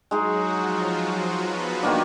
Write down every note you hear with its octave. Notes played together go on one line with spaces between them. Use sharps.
F#3 G#3 D#4 F#4 G#4
F3 F4
F#3 F#4
B3 B4
D#3 A#3 D4